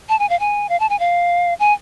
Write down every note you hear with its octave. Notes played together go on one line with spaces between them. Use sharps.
A5
G#5
F5
G#5
F5
A5
G#5
F5
G#5